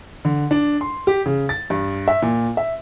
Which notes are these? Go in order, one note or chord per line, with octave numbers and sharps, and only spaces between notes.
D3
D4
C6
G4
C#3
A6
G2
E5
A#2
E5